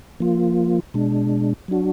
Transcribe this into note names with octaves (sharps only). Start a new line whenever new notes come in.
F3 A#3 F4
B2 G#3 D4
F#3 D4 F#4